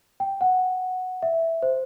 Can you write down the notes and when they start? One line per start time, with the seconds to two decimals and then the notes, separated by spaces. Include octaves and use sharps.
0.20 G5
0.41 F#5
1.22 E5
1.62 C5